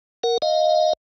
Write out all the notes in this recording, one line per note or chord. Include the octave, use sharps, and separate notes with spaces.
A#4 F#5
D#5 F5